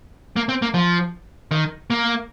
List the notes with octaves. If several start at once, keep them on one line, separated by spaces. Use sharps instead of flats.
A#3
C4
A#3
F3
D#3
A#3